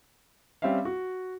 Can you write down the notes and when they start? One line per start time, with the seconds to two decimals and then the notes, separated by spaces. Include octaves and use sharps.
0.62 G3 C4 C#4 E5 F5
0.85 F#4